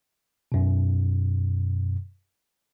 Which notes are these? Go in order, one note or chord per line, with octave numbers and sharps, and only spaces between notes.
F#2 B2